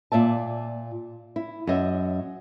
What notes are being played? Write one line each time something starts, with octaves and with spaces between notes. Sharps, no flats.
A#2 D5 E5 A5
E4
F#2 D#5 E5